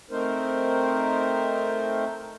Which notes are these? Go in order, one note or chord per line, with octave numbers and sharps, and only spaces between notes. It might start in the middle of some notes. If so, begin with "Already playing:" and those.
A3 C4 D#4 A#4 C5